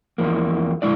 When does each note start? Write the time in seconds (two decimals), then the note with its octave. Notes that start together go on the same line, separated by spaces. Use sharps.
0.18 E2 F3 A#3
0.82 A#2 D3 G#3 E4 D5